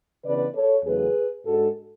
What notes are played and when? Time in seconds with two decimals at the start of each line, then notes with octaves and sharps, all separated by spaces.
0.24 C#3 E3 B3 D4 B4 D5
0.55 A4 C#5
0.85 E2 C#3 F#3 A3 G#4 B4
1.46 G#2 G#3 D4 F#4 A4